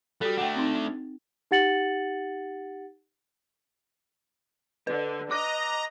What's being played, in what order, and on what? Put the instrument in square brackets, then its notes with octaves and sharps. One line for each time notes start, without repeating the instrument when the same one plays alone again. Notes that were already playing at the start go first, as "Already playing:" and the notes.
[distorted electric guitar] G3 [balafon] F#4 A4
[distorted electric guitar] A3 D4 [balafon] F#5 G5
[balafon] C4 D#4
[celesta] D#4 G4 F#5 A6 C#7 F#7
[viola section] D3 [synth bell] B4
[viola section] D#5 [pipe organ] A#5 [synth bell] D6 F#6 A#6